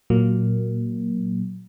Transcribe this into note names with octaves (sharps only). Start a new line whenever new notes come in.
A#2 F#3 A#3